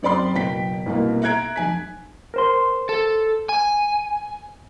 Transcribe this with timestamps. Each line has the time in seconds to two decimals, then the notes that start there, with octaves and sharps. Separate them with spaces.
0.02 F#2 C4 D5 B5 C6
0.34 F#1 B2 G5 B6
0.86 C2 B2 A#3
1.22 E5 A#5 F#6 G#6 D7
1.56 F1 G#5 B6
2.34 A#4 C5 C6
2.89 A4
3.49 G#5